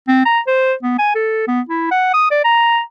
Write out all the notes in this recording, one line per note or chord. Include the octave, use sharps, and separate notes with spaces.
C4
A#5
C5
B3
G#5
A4
B3
E4
F#5
D#6
D5
A#5